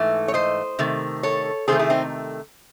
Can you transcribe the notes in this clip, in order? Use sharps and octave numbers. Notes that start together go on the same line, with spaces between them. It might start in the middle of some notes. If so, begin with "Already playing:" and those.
Already playing: G#2 E3 A3
C#5
C5 D#5
C3 D#3 A3
A4 C#5
C3 D#3 A3 G#4 C5
E4 G#4
C4 D#4